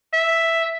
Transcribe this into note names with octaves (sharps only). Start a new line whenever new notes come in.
E5